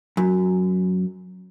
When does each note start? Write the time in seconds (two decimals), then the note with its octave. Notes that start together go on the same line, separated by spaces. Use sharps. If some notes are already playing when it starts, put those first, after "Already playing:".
0.17 F#2